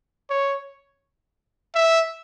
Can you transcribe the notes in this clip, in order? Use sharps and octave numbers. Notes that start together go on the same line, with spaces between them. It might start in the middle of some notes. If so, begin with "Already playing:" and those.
C#5
E5